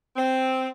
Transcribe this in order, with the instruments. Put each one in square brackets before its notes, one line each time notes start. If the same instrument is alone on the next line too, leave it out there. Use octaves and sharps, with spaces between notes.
[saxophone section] C4